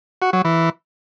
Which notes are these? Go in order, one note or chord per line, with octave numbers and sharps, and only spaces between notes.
F#4
F#3
E3